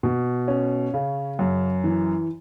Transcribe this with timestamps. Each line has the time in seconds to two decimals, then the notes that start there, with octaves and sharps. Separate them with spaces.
0.03 B2
0.48 C#4
0.94 C#3
1.39 F#2
1.84 E3